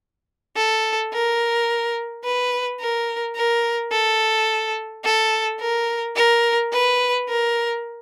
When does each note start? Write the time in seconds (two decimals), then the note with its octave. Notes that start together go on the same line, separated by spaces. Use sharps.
0.56 A4
1.13 A#4
2.24 B4
2.80 A#4
3.36 A#4
3.92 A4
5.05 A4
5.60 A#4
6.16 A#4
6.72 B4
7.29 A#4